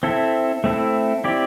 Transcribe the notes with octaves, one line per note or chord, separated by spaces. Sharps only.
C4 E4 A4 E5
A3 C4 E4 A4
C4 E4 G4 D5